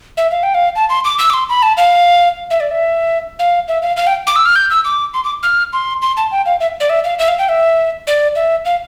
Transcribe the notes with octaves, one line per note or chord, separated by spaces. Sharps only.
E5
F5
G5
F5
A5
C6
D6
E6
D6
C6
B5
A5
F5
E5
D5
E5
F5
E5
F5
F5
G5
D6
E6
F6
G6
E6
D6
C6
D6
F6
C6
C6
A5
G5
F5
E5
D5
E5
F5
E5
F5
G5
E5
D5
E5
F5